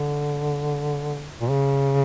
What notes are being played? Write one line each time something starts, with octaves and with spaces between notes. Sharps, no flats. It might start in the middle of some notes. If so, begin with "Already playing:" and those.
Already playing: D3
A#2
C#3